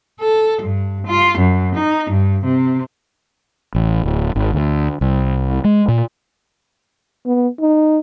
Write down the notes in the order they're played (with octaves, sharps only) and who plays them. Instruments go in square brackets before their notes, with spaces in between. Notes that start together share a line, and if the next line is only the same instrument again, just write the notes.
[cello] A4
G2
F4
F#2
D#4
G2
C3
[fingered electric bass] A1
D1
G#1
D2
C2
G#3
A#2
[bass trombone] B3
D#4